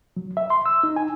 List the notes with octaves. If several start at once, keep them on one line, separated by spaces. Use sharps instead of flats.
F#3
E5
C6
E6
D#4
G#5